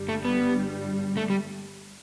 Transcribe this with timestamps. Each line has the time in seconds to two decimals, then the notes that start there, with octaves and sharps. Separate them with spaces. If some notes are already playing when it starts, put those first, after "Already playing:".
Already playing: G1 G2 G3
0.09 A3
0.25 B3
1.17 A3
1.30 G3